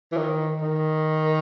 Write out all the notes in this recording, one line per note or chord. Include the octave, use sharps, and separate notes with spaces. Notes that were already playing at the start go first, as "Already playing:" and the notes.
E3
D#3
D#3